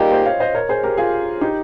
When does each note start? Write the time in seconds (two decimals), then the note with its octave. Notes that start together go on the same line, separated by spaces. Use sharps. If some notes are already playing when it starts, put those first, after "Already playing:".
Already playing: G3 A#3 D#4 F4 G4 G#4
0.11 C5 D#5
0.26 C#5 F5
0.40 C5 D#5
0.55 A#4 C#5
0.69 G#4 C5
0.83 G4 A#4
0.98 F4 G#4
1.41 D#4 G4